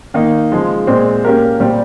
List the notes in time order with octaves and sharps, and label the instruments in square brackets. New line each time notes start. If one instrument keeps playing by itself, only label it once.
[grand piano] D#3 A#3 D#4
C#3 F3 G#3
A#2 G#3 C4
A#3 C#4 G4 A#4
A#2 G3 C4 G4